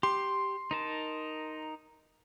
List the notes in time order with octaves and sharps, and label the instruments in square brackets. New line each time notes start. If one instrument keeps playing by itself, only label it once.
[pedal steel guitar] G4 [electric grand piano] C6
[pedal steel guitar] D#4 A#4 A5